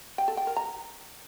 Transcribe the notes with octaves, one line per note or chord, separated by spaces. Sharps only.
G5
A4
G5
A#4
A#5